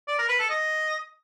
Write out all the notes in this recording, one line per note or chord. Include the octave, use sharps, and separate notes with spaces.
D5
A#4
B4
A4
D#5